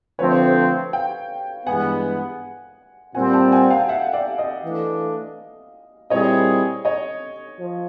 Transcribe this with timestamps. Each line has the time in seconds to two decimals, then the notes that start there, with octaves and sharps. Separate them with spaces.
0.19 D3 F3 A3 C4 B4 C#5
0.93 F5 G5
1.66 G2 E3 G#3 B3 F#5 G#5
3.14 A#2 G3 C4 F#5 G#5
3.33 G5 A5
3.52 F#5 G#5
3.70 F5 G5
3.89 E5 F#5
4.13 D5 E5
4.38 D#5 F5
4.63 E3 A3 D4
6.10 A#2 G3 C4 E4 G#4 C#5 D#5
6.85 C#5 D#5
7.58 F3